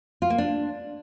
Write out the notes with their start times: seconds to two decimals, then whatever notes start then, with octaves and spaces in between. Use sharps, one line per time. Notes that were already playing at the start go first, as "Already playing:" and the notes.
0.22 F4
0.30 A#3
0.38 D4